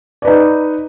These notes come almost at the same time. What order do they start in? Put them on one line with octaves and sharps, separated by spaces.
D5 B4 D#4